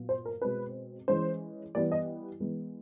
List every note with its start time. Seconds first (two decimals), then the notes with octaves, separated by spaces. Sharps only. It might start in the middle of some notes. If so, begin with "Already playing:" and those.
Already playing: A#2 F#3 B3
0.09 C5
0.25 A#4
0.42 B2 G#3 C4 B4
1.08 E3 G#3 C#4 C5
1.75 E3 G3 B3 D5
1.92 D#5
2.40 E3 G#3 B3